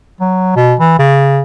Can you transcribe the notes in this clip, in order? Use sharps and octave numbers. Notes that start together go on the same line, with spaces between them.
F#3
B2
E3
C#3